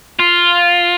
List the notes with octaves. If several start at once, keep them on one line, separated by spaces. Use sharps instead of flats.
F4